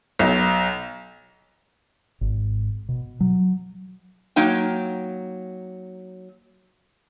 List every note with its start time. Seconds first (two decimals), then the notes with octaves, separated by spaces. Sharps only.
0.19 B1
2.21 G#1
2.89 B2
3.21 F#3
4.36 F#3 A#3 D#4 G5